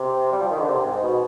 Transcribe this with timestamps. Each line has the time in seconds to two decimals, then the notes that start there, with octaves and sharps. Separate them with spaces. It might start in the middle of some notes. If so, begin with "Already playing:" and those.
Already playing: C3
0.32 G3
0.41 F3
0.50 D#3
0.59 D3
0.69 C3
0.85 G#2
1.02 B2